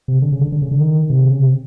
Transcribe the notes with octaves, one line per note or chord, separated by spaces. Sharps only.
C3
D3
C#3
D3
D3
C#3
D3
D#3
C3
C#3
C3